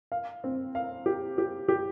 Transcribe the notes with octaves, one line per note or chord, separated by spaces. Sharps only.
F5
C4
F5
G4
G4
G4